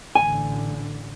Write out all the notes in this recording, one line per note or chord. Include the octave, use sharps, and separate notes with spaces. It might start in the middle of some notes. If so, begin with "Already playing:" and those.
A1 D3 G#5